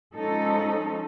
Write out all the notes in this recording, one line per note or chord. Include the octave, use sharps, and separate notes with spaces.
F3 G#3 C#4 D#4 A4